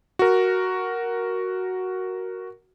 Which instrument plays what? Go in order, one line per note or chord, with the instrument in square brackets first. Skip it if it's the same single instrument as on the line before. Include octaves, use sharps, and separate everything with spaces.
[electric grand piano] F#4 A#4